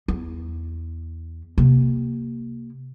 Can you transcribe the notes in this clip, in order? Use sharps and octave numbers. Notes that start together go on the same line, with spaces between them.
E2
C3 A#3